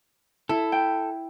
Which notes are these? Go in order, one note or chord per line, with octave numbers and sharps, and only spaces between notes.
E4 A4
G5